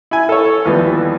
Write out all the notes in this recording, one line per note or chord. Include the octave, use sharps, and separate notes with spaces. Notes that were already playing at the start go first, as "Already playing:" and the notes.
E4 G#5
A4 C#5
D#2 E3 F3 G3 B3